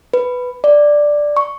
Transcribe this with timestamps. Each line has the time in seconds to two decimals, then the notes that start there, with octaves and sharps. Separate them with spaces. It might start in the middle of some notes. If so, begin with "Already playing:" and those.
0.14 B4
0.64 D5
1.37 C#6